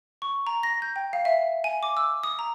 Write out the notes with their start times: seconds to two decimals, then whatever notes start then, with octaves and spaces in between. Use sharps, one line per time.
0.22 C#6
0.47 A#5
0.63 A#6
0.82 G6
0.96 G5
1.13 F5
1.25 E5
1.64 G#5
1.83 D6
1.97 E6
2.23 D#6
2.39 A#5